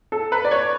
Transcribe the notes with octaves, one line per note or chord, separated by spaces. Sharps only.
A4
B4
D5
C#5